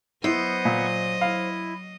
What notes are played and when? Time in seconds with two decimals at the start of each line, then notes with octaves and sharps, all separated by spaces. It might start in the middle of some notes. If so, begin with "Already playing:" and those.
0.24 F#3 B3 E4 C5 D#5 C#6
0.65 A#2
1.21 E4 F5